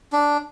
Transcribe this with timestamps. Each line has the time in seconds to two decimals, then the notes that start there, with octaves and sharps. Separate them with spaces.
0.13 D4